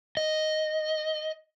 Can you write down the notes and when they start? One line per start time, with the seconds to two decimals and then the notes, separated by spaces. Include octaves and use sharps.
0.17 D#5